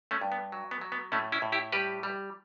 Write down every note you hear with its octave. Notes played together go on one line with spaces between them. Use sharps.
A3 C#4
G2
B3
F#3
B3
F#3
B3
A2 A3 C#4
C#4 E4
A2
E4 G4
G3 G4 B4
G3